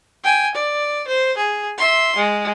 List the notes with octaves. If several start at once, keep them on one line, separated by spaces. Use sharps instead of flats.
G5 G#5
D5
C5
G#4
E5 C6
G#3